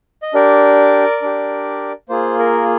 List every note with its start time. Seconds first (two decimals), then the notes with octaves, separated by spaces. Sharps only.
0.22 D#5
0.34 D4 G4 A#4 D5
1.22 D4 G4
2.09 A#3 F4 G#4 C5
2.39 A#4